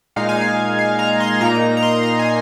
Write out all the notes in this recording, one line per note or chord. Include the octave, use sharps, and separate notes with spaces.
A#2 G#3 D#4 F5
G#5
F5
F5
A#5
C6
A#2 A#3 D#4 A#5
A#5
C6
A#5
G#5